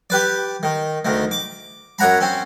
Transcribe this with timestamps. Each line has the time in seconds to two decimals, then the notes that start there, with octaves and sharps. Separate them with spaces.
0.10 G4 B4 D5
0.63 D#3
1.05 D2 D#3
1.31 D6
1.99 F#2 C#5 F#5 A#5 B5
2.20 C4 C#4